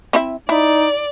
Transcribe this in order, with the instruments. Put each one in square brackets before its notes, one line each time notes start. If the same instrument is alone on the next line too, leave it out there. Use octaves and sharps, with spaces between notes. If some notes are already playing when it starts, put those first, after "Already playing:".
[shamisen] C4 E4 E5
[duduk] D#4 [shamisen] E4 [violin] D5